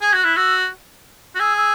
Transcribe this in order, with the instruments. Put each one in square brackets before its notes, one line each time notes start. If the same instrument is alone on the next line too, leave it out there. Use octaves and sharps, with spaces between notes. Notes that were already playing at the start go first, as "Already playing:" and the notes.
[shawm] G#4 [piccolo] G#6
[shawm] F#4
[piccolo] F#6
[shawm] E4
[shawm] F#4 [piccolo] E6
[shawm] F#4
[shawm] G#4 [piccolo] E6
[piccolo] E6